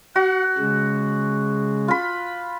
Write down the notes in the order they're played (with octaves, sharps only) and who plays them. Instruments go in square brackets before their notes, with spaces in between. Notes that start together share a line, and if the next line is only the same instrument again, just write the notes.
[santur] F#4 [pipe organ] F#5
[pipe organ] C#3 G#3
[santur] F4 B5